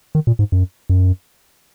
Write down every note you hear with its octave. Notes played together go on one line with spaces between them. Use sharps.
D#3
A#2
G#2
F#2
F#2